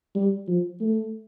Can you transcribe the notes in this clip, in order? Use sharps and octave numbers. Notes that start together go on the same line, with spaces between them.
G3
F3
A3